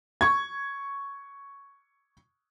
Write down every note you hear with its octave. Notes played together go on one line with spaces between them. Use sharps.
C#6 G#6